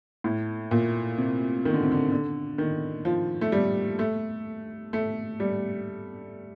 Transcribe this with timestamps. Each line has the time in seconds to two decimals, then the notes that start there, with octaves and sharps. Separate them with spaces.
0.24 A2
0.71 A#2
1.18 C3
1.65 D#3
1.74 D3
1.83 C3
1.92 D3
2.12 D3
2.58 D#3
3.05 F3
3.41 A3
3.52 G3
3.99 A3
4.93 A3
5.40 G3